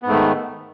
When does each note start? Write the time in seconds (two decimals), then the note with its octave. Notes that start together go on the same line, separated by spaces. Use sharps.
0.03 B3
0.06 G#2
0.09 A3
0.12 D#3